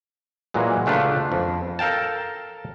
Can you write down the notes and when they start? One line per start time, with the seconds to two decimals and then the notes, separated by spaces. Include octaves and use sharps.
0.54 A#2 E3 F#3 G#3
0.86 C#2 A3 D4 F4 B4
1.32 F2
1.79 A4 A#4 F5 G5 A5